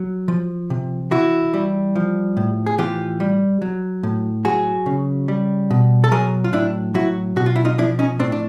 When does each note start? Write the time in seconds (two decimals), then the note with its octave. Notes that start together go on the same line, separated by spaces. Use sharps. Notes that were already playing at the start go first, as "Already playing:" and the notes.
Already playing: F#3
0.28 F3
0.70 C3
1.11 E3 E4 F#4
1.54 G3
1.95 F3
2.37 A2
2.66 G#4
2.78 E3 F4 G4
3.20 G3
3.62 F#3
4.03 A2
4.45 F#3 F#4 G#4
4.86 C#3
5.28 G3
5.71 B2
6.04 A4
6.11 F#3 G#4 A#4
6.44 F4
6.53 A2 D4 E4
6.94 F#3 E4 F#4
7.36 B2 F#4
7.46 F4
7.56 E4
7.65 D#4 F4
7.78 F3 D4 E4
7.99 C#4 D#4
8.19 A2 C4 D4
8.32 D4